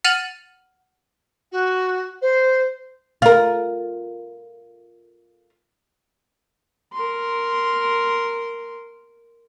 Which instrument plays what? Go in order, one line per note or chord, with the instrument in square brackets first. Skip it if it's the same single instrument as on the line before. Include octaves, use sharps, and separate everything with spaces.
[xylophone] F#5 F6 A6 D#7 F7 F#7
[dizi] F#4
C5
[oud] F4 A#4
[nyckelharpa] A#4 C6